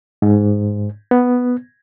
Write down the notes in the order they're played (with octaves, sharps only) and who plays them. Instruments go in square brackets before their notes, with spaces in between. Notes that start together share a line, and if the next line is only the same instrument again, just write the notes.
[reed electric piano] G#2
B3